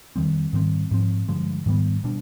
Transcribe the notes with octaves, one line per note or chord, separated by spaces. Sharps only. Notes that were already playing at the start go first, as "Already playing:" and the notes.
F2 D#3 G3 C4
G#2 D#3 G3 C4
G#2 F3 C4
G2 D3 F3 G#3
G#2 D#3 G3 B3
B2 G3 D4